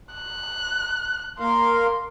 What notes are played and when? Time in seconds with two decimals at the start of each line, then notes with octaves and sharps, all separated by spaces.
0.14 F#6
1.40 A#3 A#4 F5 C6